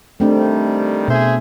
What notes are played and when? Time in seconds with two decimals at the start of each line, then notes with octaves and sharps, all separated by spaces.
0.20 D#3 G3 A3 C4 D4
1.08 B2 G#4 C5 E5